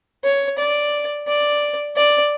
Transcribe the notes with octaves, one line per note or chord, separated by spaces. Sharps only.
C#5
D5
D5
D5